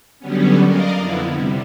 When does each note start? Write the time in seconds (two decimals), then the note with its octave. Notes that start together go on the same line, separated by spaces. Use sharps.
0.19 D3 F#3 G3 B3 C#4
0.65 A#4 D5 D#5 F5
0.96 F2 D3 B3 E4
1.34 C3 G3